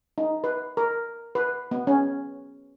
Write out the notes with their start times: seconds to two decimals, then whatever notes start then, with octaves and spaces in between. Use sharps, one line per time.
0.18 D#4
0.44 B4
0.77 A#4
1.35 B4
1.71 B3
1.87 C#4